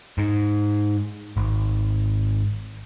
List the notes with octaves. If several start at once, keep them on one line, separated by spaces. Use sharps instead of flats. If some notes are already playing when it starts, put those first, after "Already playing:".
G#2
G#1